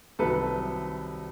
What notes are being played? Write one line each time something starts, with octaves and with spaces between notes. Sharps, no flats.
C2 C3 D#3 F#3 A4 B4